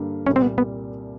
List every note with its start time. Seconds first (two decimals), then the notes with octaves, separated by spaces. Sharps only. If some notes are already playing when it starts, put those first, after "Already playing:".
Already playing: G2 D3 G3 A#3
0.26 C2 A#2 G3 C#4
0.36 C4
0.42 B3
0.58 B3